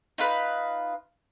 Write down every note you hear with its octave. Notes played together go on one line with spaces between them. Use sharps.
D#4 F4 B4